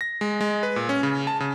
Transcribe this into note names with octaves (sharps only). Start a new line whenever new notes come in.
A#6
G#3
G#3
B4
A#2
C#4
C#3
A5
C#3